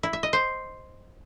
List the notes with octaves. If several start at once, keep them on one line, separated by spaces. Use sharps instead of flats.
E4
E5
D#5
C5